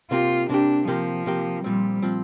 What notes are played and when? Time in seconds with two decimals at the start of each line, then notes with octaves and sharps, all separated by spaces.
0.11 C3 A#3 F4 G4
0.50 C3 A#3 D4 G4
0.88 C3 F3 A#3 G4
1.26 C3 A#3 G4
1.64 A#2 F3 G3 C4
2.02 A#2 F3 C4